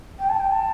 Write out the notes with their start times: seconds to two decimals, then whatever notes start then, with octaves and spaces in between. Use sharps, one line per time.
0.19 G5
0.29 A5
0.40 G5
0.52 A5